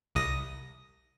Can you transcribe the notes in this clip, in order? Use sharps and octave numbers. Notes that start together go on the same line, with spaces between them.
C2 D#6 A#6